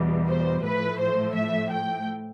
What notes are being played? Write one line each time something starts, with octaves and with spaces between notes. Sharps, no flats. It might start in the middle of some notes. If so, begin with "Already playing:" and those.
Already playing: E2 B2 G3
C5
A2 F3 A3 B4
C5
E5
G5